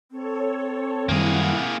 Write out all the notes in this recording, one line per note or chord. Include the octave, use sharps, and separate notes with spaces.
C4 A4 C#5
F#2 D#3 G3 A#3 E4 G#4 F#5 G#6